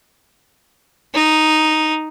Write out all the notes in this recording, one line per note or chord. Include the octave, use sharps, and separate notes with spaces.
D#4